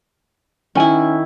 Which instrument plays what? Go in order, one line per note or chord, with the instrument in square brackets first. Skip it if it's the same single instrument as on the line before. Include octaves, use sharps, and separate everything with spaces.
[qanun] D#3 E4 [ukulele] C#4 G#5